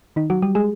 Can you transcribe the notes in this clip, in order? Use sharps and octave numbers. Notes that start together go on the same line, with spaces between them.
D#3 D#4
F#3 F#4
G3 G4
G#3 G#4